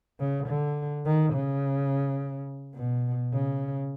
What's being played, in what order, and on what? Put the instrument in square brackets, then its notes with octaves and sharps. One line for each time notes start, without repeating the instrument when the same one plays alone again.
[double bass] C#3
D3
D#3
C#3
B2
C#3